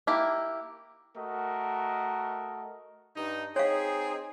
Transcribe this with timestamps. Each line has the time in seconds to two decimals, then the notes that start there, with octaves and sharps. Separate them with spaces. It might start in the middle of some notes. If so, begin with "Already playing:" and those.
0.07 A#3 E4 G4
1.16 A3 F#4 A#4 D#5
3.16 G2 D#4
3.56 C4 D#4 G#4 C#5 F5